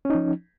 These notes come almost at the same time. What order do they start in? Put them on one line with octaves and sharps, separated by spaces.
C#4 D#4 F3